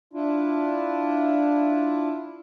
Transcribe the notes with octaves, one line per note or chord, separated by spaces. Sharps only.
D4 E4 F4